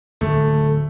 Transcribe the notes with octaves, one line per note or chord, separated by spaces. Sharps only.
D1 D2 A3